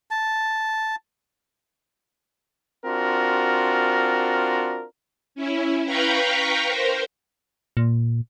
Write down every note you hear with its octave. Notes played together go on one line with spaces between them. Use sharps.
A5
C4 D4 F4 F#4 A#4
C#4 E4
B4 F5 G5 A#5 B5 C#6
A#4 C5
A#2